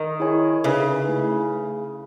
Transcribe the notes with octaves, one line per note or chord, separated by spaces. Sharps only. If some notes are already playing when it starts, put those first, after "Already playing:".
Already playing: D#3
E4 G#4 C#5 G#5
C#3 D#4 G#4 B4 E5
A3 E4